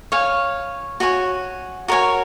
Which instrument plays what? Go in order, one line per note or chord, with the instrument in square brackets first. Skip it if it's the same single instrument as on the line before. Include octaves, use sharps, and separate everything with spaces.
[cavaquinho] C#5 F5 G#5
F#4 C#5 G#5 C#6
F#4 A#4 C#5 G#5